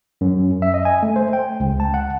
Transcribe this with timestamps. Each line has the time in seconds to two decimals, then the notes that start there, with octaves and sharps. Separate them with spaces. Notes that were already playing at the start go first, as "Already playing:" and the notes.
0.21 F#2
0.62 E5
0.74 D#5
0.85 G#5
1.03 A3
1.16 C5
1.33 G5
1.60 C#2
1.80 A5
1.94 F#5